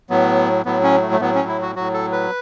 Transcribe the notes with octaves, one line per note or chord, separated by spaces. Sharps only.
A2 F#3 B3
A2 F#3 B3
C#4
A3
A3
A2 F#3 B3
C#4
E4
F#4
A2 F#3 F#4
A4
B4